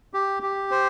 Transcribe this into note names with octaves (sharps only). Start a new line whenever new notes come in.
G4
G4
C5